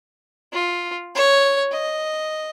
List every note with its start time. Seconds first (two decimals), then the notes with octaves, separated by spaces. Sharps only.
0.53 F4
1.15 C#5
1.71 D#5